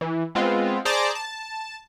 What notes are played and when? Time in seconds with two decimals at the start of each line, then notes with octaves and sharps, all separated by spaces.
0.01 E3
0.35 G#3 B3 C4 F4
0.85 G#4 C5 D5 A5 A#5 D6
1.15 A5